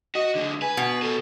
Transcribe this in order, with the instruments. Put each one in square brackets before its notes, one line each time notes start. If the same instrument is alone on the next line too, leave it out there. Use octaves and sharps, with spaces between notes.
[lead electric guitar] F#4 [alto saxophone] D#5
[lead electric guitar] D3 G#3
[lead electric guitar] B4 [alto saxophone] G#5
[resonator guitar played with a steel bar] B2
[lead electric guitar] A4 B4